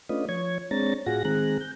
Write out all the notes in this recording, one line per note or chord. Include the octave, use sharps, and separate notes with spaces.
A3 C#4 D4 F4 B4 D#5
F3 C#5 C#6 G#6
G#3 C4 D4 C#5 A#5 A6
A2 F4 F#4 G#4 F#5 A#6
D#3 G#3 C4 G#4 A#5 F#6
G6